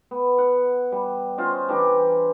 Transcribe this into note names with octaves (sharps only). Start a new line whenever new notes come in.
B3
F#5
G3
C#4 F4 C5 D#5
E3 D4 G4 A#5